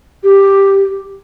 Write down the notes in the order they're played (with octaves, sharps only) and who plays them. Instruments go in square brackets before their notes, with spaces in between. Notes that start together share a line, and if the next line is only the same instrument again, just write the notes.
[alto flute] G4